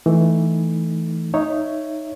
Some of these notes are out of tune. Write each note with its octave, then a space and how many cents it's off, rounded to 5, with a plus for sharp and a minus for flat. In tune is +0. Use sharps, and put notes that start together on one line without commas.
E3 +0 A3 +0 D#4 +0
D#4 +0 C#5 +0 E5 +15